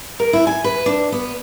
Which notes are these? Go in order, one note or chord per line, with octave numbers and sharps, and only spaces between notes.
A#4
E4
G#5
B4
D4
B3